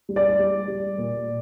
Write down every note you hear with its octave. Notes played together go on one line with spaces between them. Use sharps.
G3
D5
G3
G3
A#2